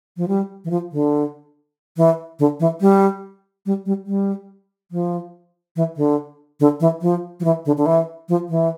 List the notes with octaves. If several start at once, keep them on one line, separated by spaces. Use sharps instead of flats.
F3
G3
E3
F3
D3
E3
D3
E3
G3
G3
G3
G3
F3
E3
D3
D3
E3
F3
F3
E3
D3
D3
E3
F3
E3